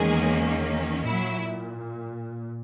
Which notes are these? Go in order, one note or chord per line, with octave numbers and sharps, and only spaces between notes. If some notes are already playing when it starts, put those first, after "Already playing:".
Already playing: E2 D#3 G#3 A#3 C#4 G#4
A#2 F#3 E4